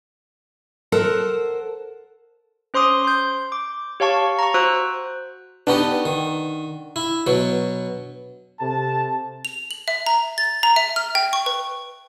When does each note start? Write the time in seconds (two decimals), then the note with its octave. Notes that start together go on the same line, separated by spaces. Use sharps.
0.92 A4 A#4 C5 F#5 A5
2.74 C#4 C5 C6 D6 D#6
3.05 C6 G6
3.52 D6
4.00 G4 C#5 F5 A5 C#6
4.39 A#5 C#6
4.54 F#4 C5 E6 F#6
5.67 B3 D4 D#4 G4 F#5 C#6
6.06 D#3
6.96 E4
7.27 B2 F#3
8.60 C3 A4 A5
9.45 F7
9.71 F#7
9.88 E5
10.06 A#5
10.38 A6
10.63 A#5
10.76 E5
10.96 F6
11.15 G5
11.33 C#6
11.46 B4